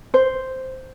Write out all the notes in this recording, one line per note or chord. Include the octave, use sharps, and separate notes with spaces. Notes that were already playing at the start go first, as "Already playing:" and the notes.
C5